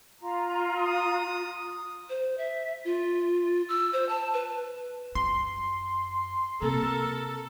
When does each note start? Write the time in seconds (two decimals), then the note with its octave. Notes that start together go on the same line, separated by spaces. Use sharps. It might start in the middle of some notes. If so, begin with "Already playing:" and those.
0.20 F4 A#5
0.77 D#6
2.10 C5
2.38 E5
2.85 F4
3.69 E6
3.93 C5
4.09 A5
4.34 B4
5.15 F#2 F4 C6
6.62 C3 A#3 A4 A#4